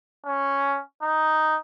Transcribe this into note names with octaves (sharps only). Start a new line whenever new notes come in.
C#4
D#4